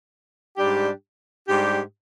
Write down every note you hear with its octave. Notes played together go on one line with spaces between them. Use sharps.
G#2 G3 D4 G4
G#2 G3 D4 G4